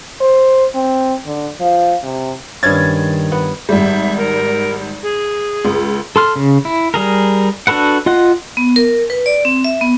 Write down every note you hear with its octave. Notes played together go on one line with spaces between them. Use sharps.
C5
C4
D3
F3
C3
G2 D#3 C#4 G#6 A6
B3
G#1 G3 E5
A#4
G#4
C#2
A4 C6 F6
C#3
E4
G3 G#4 A#4
D4 F#4 A4 B4 F#5
F4 D#5 F#5 F#6
B3
A#4
B4
D5
C4
E5
B3